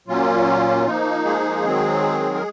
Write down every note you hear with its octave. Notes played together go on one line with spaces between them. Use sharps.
A#2 F#3 A#3 C#4 F4
F3 A#3 D#4
G#3 G#4
D#3 F#3 C4
A#4